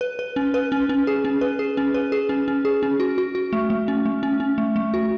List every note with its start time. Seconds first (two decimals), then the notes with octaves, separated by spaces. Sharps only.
0.01 B4
0.19 B4
0.36 C#4
0.54 B4
0.72 C#4
0.89 C#4
1.07 G#4
1.25 C#4
1.41 B4
1.59 G#4
1.77 C#4
1.94 B4
2.12 G#4
2.29 C#4
2.48 C#4
2.65 G#4
2.83 C#4
3.00 F#4
3.18 F#4
3.35 F#4
3.53 A3
3.70 A3
3.88 C#4
4.06 A3
4.23 C#4
4.40 C#4
4.58 A3
4.76 A3
4.94 F#4